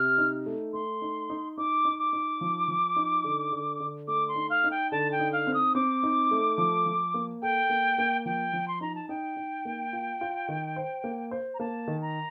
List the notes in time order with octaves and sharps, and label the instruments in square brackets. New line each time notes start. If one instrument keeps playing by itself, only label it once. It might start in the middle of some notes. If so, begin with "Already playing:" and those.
Already playing: [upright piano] C3 [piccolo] F6
[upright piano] D#4
A3
[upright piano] A3 [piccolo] C6
[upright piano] D#4
D#4
[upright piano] D#4 [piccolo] D6
[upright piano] D#4
[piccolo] D6
[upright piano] D#4
F3
F3
D#4
D3
D3
D3
[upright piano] A3 [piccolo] D6
[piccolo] C6
[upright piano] D#4
[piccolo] F5
[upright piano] D#4
[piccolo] G5
[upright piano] D3 [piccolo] A5
[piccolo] G5
[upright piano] D#4
[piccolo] F5
[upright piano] C4
[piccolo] D#6
[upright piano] C4 [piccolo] D6
[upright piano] D#4
A3
F3
F3
A#3
[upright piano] A4 [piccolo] G5
[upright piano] A#3
A#3
[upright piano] F3 [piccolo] G5
[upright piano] F3
[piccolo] C6
[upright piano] D#4 [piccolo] A#5
[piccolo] A5
[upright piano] D#4 [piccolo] G5
[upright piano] D#4
A#3
F4
F4
D#3
C5
A#3
C5
[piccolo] A#5
[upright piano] A#3 [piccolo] A5
[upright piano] D#3
[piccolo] A#5